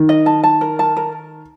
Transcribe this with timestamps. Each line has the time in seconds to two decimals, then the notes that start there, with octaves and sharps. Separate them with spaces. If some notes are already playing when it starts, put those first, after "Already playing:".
Already playing: D#3
0.09 D#5
0.26 A5
0.44 A5
0.61 A#4
0.79 A5
0.97 A#4